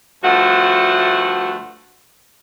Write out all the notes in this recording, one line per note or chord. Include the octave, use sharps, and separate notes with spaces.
D2 G2 F3 A3 F#4 F#5